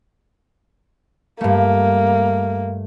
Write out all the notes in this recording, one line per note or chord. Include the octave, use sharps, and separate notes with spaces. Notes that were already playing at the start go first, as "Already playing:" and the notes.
G2 A3 A#3